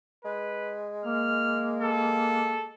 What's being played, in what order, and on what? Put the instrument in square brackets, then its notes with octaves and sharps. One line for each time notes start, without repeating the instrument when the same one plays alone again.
[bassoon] G#3 [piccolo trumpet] B4
[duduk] A#3 [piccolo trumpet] F6
[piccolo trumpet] A4